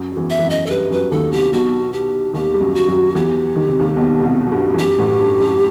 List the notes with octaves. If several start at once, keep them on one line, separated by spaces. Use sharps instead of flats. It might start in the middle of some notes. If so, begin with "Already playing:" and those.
Already playing: F#2 F#3
F#3
E2 E3
E5
E3
F#2 F#3
D#5
A4
G2 G3 B4
F#2 F#3 B4
D#2 D#3 A4
C2 C3 G4
B1 B2 F#4
G4
D#2 D#3 G4
G3
F#2 F#3
F#4
F#2 F#3
E2 E3 G4
D#3
C3
D#2 D#3
B1 B2
B2
C2 C3
F#3
G2 G3
E3
F#2 F#3 G4
A1 A2
G2
F#2